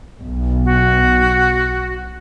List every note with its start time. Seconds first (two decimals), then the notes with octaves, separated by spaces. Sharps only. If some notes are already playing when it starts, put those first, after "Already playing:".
0.19 B1
0.65 F#4